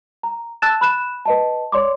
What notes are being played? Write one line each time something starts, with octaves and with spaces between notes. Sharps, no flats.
A#5
A5 E6 F#6 A6 E7
B5 F#6 E7
B4 D#5 A5
C#5 D5 C6 D6